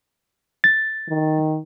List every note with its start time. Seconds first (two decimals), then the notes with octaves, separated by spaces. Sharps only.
0.64 A6
1.08 D#3